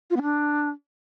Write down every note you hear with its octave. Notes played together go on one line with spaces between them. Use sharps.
F4
B3
D4